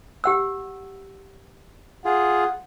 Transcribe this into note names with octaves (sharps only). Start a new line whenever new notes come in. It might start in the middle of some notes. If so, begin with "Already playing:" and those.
G4 F#5 E6
F4 G#4 F#5